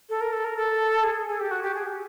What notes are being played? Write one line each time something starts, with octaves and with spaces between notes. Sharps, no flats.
A4
A#4
A4
A#4
A4
G#4
G#4
G4
F#4
G4
G#4
G4